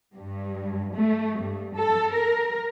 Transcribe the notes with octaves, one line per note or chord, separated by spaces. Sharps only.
G2
A3
G2
A4
A#4